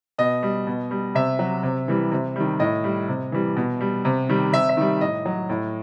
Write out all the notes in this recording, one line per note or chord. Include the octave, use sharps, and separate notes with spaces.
B2 D#5
G3
B2
G3
C3 E5
F#3
C3
E3 G3
C3
D#3 G3
A2 D#5
G3
C3
E3 G3
B2
G3
C3
D#3 G3
C3 E5
E5
D#3 G3
A2 D#5
F#3
A2